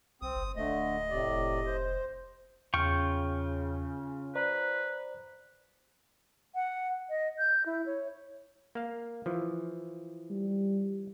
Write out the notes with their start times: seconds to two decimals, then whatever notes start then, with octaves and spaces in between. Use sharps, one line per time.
0.22 B1 C4 D#6
0.36 G1
0.56 D1 D3 A3 D#5
1.10 A2 C3 D5
1.28 F1
1.66 C5
2.74 E2 C#3 F4 G5 C#6 F6
4.35 B4 C5 D5 A#5
6.55 F#5
7.10 D#5
7.39 G6
7.66 E4
7.86 C#5
8.75 A#3 F5
9.26 E3 F3
10.30 G3